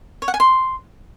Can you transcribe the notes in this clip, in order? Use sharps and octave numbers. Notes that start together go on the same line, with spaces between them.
C#5
F#5
G#5
C6